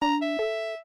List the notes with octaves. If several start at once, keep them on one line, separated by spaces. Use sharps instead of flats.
D4 A#5
E5
A4